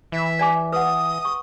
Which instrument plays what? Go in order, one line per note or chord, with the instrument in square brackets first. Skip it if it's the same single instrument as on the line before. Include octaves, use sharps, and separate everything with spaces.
[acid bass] E3 [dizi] E5
[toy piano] D5 G#5 D6
[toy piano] B4 F#5 [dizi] D#6
[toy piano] C#6